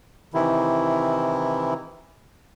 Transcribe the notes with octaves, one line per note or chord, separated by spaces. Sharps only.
C3 D#3 E3 E4